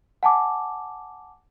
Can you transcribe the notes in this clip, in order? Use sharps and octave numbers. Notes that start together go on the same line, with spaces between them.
F#5 G#5 A5 D6